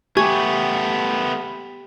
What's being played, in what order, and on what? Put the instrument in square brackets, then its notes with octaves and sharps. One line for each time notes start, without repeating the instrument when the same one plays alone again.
[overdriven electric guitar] A3 B3 [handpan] G4 [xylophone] G#5 C#6 G#6